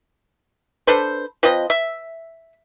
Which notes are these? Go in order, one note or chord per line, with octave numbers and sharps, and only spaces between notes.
D4 A4 B4 C5
F3 C4 B4 D#5
E5